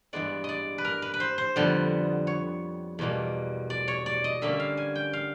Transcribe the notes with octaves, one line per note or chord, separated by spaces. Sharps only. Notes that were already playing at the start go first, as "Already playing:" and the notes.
G2 E3 G#3 B3 D5
D5 D#5
B4
A#4
B4
B4
C5
C5
F2 D3 G3 B3
C#5
E2 B2 G3 A#3
D5
C#5
D5
D#5
D3 G3 A#3 C#4 E5
F5
G#5
G5
F5